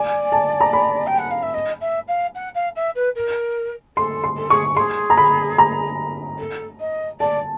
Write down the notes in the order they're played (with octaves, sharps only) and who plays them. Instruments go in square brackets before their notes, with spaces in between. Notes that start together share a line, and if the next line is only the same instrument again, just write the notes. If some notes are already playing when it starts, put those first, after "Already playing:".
Already playing: [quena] D5 [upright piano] G#5
[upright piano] A5
A#5
B5
[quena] G5
F#5
F5
E5
D#5
E5
F5
F#5
F5
E5
B4
A#4
[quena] A4 [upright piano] C6
[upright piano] C6
[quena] A4
[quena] G#4 [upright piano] C#6
[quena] G#4 [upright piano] C6
[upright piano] A#5
B5
A#5
[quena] A4
D#5
[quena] D5 [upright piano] A5